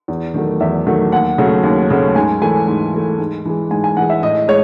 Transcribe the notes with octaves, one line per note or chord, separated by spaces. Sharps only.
E2
D#3 F#3 A3
E2 E5
D#3 F#3 A3
D#2 F#5
C#3 F#3 A3
D#2
C#3 F#3 A3
G#2 G#5
E3 A3 G#5
G#2
E3 A3
G#2
E3 G#3
G#2 G#5
G#5
E3 G#3 F#5
E5
A2 D#5
G#3 C#5